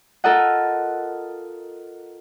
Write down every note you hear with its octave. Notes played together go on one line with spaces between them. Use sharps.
F4 A4 A#4 D#5 F#5